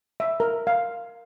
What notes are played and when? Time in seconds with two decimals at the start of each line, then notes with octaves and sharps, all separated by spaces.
0.20 E5
0.40 A#4
0.67 F5